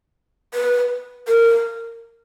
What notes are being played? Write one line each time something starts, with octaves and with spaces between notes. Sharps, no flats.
B4
A#4